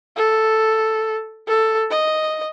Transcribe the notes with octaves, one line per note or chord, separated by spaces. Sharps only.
A4
A4
D#5